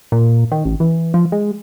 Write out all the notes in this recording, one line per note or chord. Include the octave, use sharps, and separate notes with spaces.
A#2
D#3
A1
E3
F3
G#3